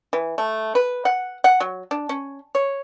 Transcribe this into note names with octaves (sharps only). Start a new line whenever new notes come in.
E3
A3
B4
F#5
F#5
F#3
D4
C#4
C#5